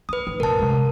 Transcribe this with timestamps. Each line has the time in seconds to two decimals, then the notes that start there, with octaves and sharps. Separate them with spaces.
0.09 C#4 B4 D#6
0.27 D#3
0.40 F#2 A#2 A#4 A5
0.59 C3 G#3